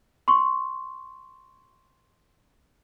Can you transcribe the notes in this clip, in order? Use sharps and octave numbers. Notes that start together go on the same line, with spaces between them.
C6 C#6